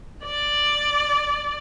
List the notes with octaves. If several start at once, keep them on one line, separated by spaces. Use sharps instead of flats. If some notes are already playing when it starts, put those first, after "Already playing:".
D5